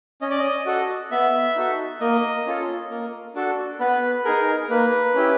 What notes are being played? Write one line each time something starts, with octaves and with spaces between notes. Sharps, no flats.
C#4 D#5
D5
D#5
F#4 A4
B3 E5
D#4 F#4 A4
A#3 D#5
C#4 F4 A4
A#3
D4 F#4 A4
B3 B4
D#4 G#4 A#4
A#3 B4
C#4 E4 G4